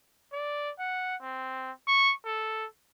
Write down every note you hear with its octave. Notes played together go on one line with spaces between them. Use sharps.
D5
F#5
C4
C#6
A4